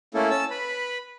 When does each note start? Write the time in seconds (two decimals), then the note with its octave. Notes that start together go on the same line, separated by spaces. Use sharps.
0.14 A3 A#3 C#4 E4 A4
0.30 C#4 A5 E6
0.50 B4 B5